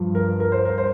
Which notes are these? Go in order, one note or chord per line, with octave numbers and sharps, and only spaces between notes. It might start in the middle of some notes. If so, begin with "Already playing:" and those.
Already playing: G2 F3
A#4
A#4
C5
A#4
C5